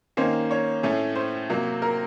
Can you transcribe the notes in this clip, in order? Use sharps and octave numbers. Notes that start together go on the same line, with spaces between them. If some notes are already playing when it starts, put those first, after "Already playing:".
D#3 A#3 C#4 C5
C#5
A2 A3 C#4
C5
C3 F#3 A#3
A#4